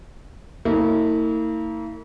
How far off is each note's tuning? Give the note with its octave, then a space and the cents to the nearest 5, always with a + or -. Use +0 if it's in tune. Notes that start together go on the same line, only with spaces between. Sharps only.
A#3 -40 E4 -40